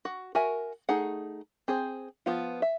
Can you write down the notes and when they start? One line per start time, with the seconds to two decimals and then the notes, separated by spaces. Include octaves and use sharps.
0.05 F#4
0.35 F#4 A#4 E5 G#5
0.89 A3 D#4 G#4 F#5
1.68 C4 G#4 C5
2.26 F3 B3 F4
2.62 E5